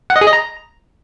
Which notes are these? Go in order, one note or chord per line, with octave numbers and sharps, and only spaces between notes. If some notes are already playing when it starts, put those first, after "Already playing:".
F#5
D#5
G#4
D#5
A#5